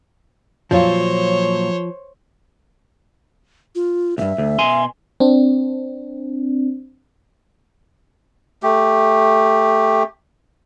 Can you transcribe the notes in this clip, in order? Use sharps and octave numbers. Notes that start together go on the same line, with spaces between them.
A#2 F3 F#3 F4 C5 C#5
F4
C#2 G2 E5
D2
B2 G#5 C6
C4 D4
A3 G4